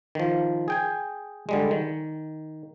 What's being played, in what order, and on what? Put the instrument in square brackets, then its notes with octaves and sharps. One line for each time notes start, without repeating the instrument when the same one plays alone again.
[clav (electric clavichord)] D#3 F3
G#4 G5 G#5
D3 G3 G#3
D#3